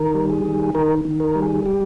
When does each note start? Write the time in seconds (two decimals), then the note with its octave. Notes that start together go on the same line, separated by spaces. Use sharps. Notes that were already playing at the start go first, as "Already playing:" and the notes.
Already playing: D#3 A#4
0.15 G3
0.30 G#4
0.45 D#3
0.75 D#3 A#4
1.05 D#3
1.20 A#4
1.35 G3
1.42 G#4
1.66 G4